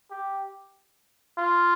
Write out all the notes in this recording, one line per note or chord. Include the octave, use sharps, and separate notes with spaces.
G4
F4